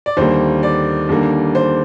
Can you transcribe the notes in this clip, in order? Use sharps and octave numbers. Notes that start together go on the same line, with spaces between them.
D5
D#2 D3 G3 A#3 C5
D5
D#2 D3 G3 A#3
C5